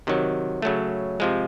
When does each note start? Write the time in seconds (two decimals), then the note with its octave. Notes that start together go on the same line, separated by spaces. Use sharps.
0.07 C3 D#3 F#3
0.62 C#3 F#3 A3
1.20 C3 F3 G#3